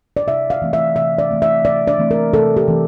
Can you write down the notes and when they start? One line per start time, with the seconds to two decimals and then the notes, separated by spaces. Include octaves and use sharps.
0.17 D5
0.27 C3 E5
0.50 F5
0.62 E3 A3 C4
0.73 E5
0.96 C3 E5
1.18 D5
1.30 E3 A3 C4
1.42 E5
1.65 C3 D5
1.87 D5
1.99 E3 A3 C4
2.11 A#4
2.33 C3 A4
2.57 G4
2.68 E3 A3 C4